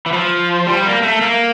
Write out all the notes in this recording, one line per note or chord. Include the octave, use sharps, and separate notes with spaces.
E3
F3
G3
A#3
A3
A#3